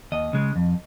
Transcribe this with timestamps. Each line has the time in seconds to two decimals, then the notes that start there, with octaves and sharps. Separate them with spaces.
0.12 D#2 D#5
0.33 C#3 G#3
0.56 F2